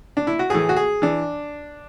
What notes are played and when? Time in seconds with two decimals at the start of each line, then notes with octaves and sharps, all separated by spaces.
0.17 D4
0.27 E4
0.39 F#4
0.50 A2 E3 G#4
0.69 F#4
0.76 G#4
1.02 E3 D4